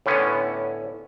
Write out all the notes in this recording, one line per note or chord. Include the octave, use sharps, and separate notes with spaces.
A2 D3 B3 C#4